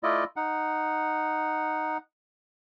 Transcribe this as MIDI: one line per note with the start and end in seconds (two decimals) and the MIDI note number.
0.03 0.24 57
0.03 0.24 64
0.03 0.24 65
0.03 0.24 74
0.03 0.24 75
0.36 1.98 63
0.36 1.98 78